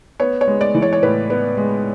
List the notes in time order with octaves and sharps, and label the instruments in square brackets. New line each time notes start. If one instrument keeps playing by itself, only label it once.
[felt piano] B3 C#5
C#5
G#3
D5
E3
C#5
C#5
A2 B4
B3
G#3